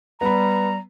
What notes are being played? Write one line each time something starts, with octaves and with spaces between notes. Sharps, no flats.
G3 B3 A#5 B5